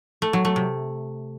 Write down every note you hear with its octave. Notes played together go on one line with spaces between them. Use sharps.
A3
F#3
A3
C3